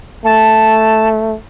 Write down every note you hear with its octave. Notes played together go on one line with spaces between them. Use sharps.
A3 A5